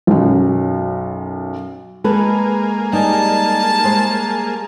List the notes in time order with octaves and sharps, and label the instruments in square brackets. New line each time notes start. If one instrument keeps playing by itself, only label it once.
[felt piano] B1 F#2
[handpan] G#3 [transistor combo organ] A#3 G#4 [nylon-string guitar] A4 B4
[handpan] G3 [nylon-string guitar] D#4 D5 G#5 [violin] A5
[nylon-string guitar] G#3 C5